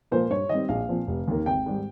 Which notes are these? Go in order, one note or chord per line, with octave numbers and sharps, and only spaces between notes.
A#2 F3 A#3 C5
G2 C#5
D#3 G3 C4 D#5
A#1 F5
A#2 F3 C4
F1
D#2 D#3 A#3
G#1 G5
G#2 D#3 G3